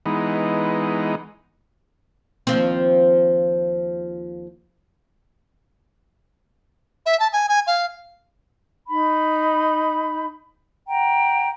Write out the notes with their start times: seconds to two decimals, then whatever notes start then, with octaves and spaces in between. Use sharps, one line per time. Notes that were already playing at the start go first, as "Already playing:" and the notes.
0.06 E3 G#3 B3 D#4
2.47 D#2 F3 C4
7.06 E5
7.20 A5
7.33 G#5
7.49 G#5
7.67 F5
8.88 D#4 B5
10.87 F#5 G5 A#5